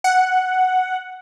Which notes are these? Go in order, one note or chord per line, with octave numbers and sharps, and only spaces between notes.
F#5